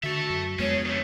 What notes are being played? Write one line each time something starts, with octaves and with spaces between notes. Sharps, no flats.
D3 F#4 A4 E5
F#2
F2 G#3 B3 C#4 G#4 C#5
C#3 A3